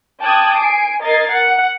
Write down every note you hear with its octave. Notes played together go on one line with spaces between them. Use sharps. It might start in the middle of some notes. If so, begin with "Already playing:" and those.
G5 A5 D6 D#6 F#6 G#6
G#5 C7 D7
A#4 D#5 G#6 A6 C7
F#5